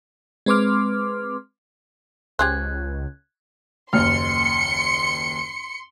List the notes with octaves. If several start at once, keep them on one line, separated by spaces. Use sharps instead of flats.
G#3 C4 B4 C6 D6 F6
C#2 G4 G#4 C5 F#6 G#6
F#1 D#2 C6 F6 C#7